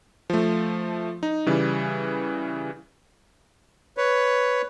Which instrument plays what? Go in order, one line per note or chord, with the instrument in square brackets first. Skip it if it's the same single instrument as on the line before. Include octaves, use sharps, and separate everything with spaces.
[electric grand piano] F3 A3
D#4
C#3 E3 G3
[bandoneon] B4 C#5